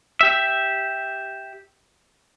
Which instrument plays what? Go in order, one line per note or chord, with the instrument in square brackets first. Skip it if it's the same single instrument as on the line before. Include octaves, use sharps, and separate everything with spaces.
[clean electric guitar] G4 E5